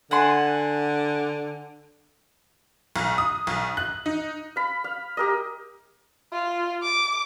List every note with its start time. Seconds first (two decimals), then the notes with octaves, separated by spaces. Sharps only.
0.11 D3 F#5 G#5 C6
2.96 B1
3.18 D#6
3.47 B1
3.77 F#6
4.06 D#4
4.56 F5 B5
4.84 F5
5.17 G4 A#4 D#5
6.32 F4
6.82 D6